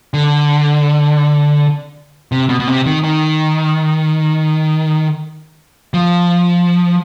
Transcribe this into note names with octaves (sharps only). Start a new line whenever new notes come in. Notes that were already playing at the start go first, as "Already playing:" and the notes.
D3
C3
B2
B2
C3
D#3
D#3
F3